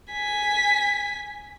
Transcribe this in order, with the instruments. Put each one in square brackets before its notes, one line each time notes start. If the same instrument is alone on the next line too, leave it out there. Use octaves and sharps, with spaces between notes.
[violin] G#5 B6